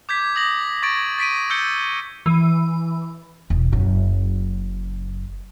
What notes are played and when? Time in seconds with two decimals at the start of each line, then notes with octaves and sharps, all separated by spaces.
0.09 D6 G6 G#6 B6
0.35 D6 D#6 A#6 F#7
0.83 C#6 G#6 A6 D7
1.19 A6 B6 D7 D#7
1.50 E6 G6 C#7 G7
2.26 E3
3.50 E1
3.73 F#1 F#2